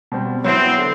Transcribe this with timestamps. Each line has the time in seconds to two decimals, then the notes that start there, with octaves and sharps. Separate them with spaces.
0.12 B2 G3 C4
0.44 F#3 B3 C4 E4
0.78 D3